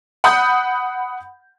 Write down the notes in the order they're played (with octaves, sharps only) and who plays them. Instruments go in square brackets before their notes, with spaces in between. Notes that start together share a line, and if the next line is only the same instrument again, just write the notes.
[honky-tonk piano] F#5 B5 D#6 G6